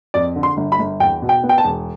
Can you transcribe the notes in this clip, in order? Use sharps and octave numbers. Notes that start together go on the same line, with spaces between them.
F2 D5
D3
C6
G1
B5
G1
E2 G5
B2
G5
B3
G5
A5
E1